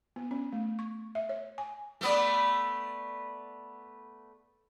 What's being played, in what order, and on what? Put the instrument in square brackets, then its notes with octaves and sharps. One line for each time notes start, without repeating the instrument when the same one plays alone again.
[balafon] B3
C#4
A3
C#6
E5
C#5
G#5
[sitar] A3 B3 D5